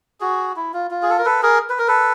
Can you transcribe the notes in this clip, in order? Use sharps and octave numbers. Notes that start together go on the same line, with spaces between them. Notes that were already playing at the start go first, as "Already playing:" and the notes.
F#4 G#4
E4
F4
F4
G#4
A4
A#4
A4 B4
G#4 A#4
B4
A#4
A4 B4